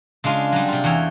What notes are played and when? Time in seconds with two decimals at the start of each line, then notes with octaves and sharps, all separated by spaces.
0.24 C#3 G#3 D4 F4
0.52 F#3 G3
0.68 C3 F4
0.84 E2 E3 C#5 G5